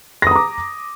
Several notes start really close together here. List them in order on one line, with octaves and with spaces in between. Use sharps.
A#6 D#6 A#5 D6